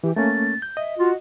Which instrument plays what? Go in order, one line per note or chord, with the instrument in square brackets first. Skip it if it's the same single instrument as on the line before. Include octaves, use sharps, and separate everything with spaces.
[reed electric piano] E3 [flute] G4
[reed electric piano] A3 A#3 C#4 [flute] A6
[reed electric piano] G6
[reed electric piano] D#5 [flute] E5
[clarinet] F4 [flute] F#4